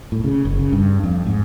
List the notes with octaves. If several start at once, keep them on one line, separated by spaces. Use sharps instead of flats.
A2
C#3
F#1
C#3
G2
F2
G#2